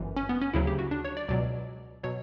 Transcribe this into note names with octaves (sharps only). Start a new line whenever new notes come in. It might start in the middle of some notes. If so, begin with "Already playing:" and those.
Already playing: G1 F#2 E3
C#4
B3
C#4
D2 C#3 F#3 E4
G4
F#4
D4
C#5
D5
C#2 B2 F#3 D5
B2 F#3 C#5